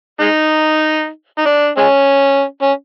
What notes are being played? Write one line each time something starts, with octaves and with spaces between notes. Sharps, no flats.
G#3 D#4
D#4
D4
G#3 C#4
C#4